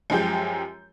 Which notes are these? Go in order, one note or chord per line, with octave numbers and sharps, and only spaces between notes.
F#2 F3 G#3 G4 G6